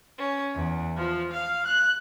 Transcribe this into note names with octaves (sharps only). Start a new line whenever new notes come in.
C#4
E2
F3
F5
F#6